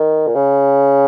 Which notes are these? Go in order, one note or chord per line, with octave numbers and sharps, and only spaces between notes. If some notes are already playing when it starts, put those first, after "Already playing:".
Already playing: D#3
A#2
C#3